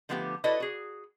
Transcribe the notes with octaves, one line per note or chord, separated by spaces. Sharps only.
D3 F3 A3 B3 E4 G4
E4 F#4 A4 B4 D5 D#5
F#4 G#4